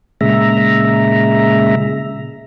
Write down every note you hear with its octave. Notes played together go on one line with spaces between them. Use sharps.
A#2 C#3 G#3 E5 A#5